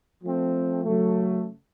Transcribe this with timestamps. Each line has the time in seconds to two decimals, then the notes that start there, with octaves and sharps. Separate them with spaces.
0.23 F3 A3 C4
0.84 C#3 F#3 A3